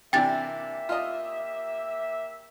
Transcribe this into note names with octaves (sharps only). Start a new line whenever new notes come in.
C3 E3 A#3 D4 G4 E5 G5 A6
F4 D#5